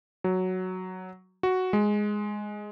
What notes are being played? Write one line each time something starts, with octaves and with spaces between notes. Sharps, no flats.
F#3
F#4
G#3